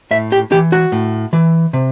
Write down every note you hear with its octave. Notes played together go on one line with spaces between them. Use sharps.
A2 E5
G4
E3 G4
F#4
A2
E3
C3